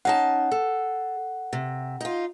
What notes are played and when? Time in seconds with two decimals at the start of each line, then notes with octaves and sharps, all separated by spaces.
0.05 C#4 D#4 F#5 A5
0.51 A4
1.53 C3
2.01 D#4 F4